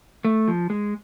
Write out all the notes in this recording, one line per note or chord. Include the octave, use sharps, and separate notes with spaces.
A3
F3
G#3